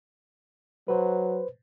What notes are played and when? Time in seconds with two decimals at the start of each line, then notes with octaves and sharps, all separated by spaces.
0.88 F#3 B4 C5